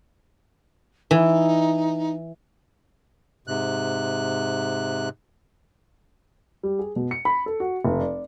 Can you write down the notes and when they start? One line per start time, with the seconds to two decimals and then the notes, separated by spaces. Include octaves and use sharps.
1.11 E3 D#4
3.48 G#2 C3 F#6
6.63 G3
6.79 G#4
6.96 B2
7.11 C#7
7.25 B5
7.46 A4
7.60 F#4
7.85 F1
8.00 D5